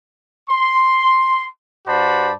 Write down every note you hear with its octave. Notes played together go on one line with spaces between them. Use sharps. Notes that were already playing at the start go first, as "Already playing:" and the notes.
C6
G2 F#4 C5 D5 A5 B5